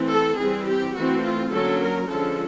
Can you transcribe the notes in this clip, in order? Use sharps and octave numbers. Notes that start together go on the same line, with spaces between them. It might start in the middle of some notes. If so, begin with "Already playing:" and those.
Already playing: E3 A3 C4
A4
E3 G3 C4 G#4
G4
E3 A3 C4 F#4
F4
D3 F#3 A#3 C#4 A4
A#4
D3 F3 G#3 C#4 A4